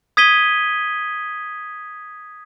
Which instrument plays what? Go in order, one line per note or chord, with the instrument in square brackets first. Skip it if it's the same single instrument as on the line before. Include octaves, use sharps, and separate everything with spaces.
[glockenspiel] D#6 G#6 B6 D#7 G7